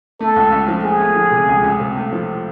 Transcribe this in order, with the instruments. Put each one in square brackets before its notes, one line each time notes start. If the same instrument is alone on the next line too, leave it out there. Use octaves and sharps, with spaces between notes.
[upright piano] A3 [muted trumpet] A4
[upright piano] C#2
C#2
F3
[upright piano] A3 [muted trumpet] G#4
[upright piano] A3
F3
C3
C#2
C#2
C3
A3
F3